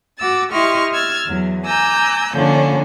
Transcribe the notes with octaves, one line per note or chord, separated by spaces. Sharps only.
F#4 D6 E6 A6
E4 G4 D#5 C6 C#6 F6
E6 F6 G#6 A6
E2 F#3
G#5 A#5 D6 E6 G6
D3 F3 A#3 C#4 D4